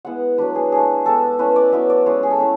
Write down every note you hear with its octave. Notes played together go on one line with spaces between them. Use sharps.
G#3 B3 E4 F#5
F#3 A3 D4 B4
G#4
A3 D4 G#4
G#3 B3 D4 A4
A3 C#4 E4 B4
D5
F#3 B3 E4 E5
D5
G#3 C#4 E4 C#5
G#4
A4
A3 C#4 E4